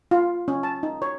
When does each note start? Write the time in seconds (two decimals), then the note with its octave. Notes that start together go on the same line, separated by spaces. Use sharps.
0.11 F4
0.48 C#4
0.63 A5
0.83 D#4
1.02 C#5